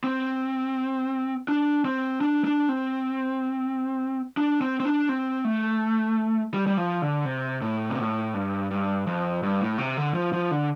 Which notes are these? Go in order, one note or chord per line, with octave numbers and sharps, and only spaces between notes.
C4
D4
C4
D4
D4
C4
D4
C4
C4
D4
C4
A3
G3
G3
F3
D3
C3
A2
C3
A2
G2
G2
F2
G2
A2
C3
D3
F3
F3
D3